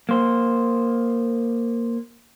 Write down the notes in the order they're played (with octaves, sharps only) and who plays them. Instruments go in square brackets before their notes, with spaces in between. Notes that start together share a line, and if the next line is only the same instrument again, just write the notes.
[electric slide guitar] A#3 C5